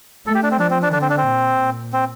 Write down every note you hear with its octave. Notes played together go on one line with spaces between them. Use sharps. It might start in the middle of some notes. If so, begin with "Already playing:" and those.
A3 A4
G4
D4
C4
F3 D4
C4
D4
D3 D4
C4
D4
C4
A#2
A#2
C4